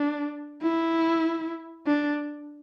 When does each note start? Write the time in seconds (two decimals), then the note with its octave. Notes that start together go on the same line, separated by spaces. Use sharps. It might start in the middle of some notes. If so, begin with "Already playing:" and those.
Already playing: D4
0.63 E4
1.87 D4